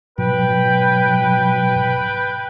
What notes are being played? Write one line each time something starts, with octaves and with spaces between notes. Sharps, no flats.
G#2 B2 F#3 B4 G5